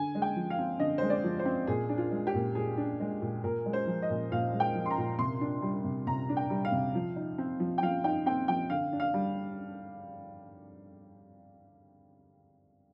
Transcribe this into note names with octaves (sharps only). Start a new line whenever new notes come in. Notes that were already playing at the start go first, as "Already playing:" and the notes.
Already playing: D3 G#5
G#3
G5
F3
F5
C4
D3 D#5
G#3 C5
D5
F3
C5
C4
A#2 G#4
D4
F4
G#3
G4
A#2
A#2 G#4
D4
G#3
A#2
A#2 A#4
G#3
C5
F3
D#5
A#2
A#2 F5
G#3
G5
F3
C6
A#5
A#2
C3 C6
D4
G3
C3
C3 A#5
D4
G5
G3
F5
C3
F3
D#4
C4
F3
G5
F3 F5
D#4 G5
C4 G5
F3 G5
D3 F5
D4
F5
G3